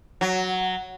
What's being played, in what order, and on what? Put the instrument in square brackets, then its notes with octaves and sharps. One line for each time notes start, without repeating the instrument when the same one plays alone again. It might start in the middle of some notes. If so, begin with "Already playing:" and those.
[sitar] F#3